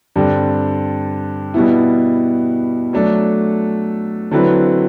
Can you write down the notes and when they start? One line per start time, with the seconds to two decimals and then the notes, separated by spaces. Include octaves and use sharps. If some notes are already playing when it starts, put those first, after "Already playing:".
0.16 G2 D3 G3 C4
1.54 B2 G3 B3 E4
2.93 F#3 A3 D4 A4
4.31 D3 F#3 C4 E4 B4